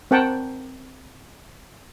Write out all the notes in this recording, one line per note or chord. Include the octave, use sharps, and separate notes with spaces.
C4 A#4 F#5 G5 A5